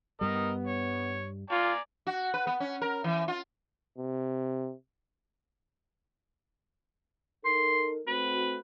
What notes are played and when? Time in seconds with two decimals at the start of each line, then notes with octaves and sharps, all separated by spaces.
0.21 G2 G3 B3 A#4 D#5
0.67 C#5
1.50 F4 D5 G#5 A#5
2.07 F#4
2.34 B4
2.47 B3
2.60 C#4
2.81 A#4
3.04 E3
3.28 F4
3.98 C3
7.45 D#4 A4 A#4 C6
8.07 A3 C4 F#4 B4